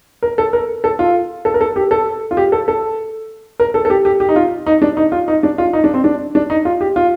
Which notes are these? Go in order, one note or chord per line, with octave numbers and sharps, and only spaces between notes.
A#4
A4
A#4
A4
F4
A4
A#4
A4
G4
A4
F4
G4
A4
A4
A#4
A4
A4
G4
G4
G4
D#4
F4
D#4
D4
D#4
F4
D#4
D4
F4
D#4
D4
C4
D4
D4
D#4
F4
G4
F4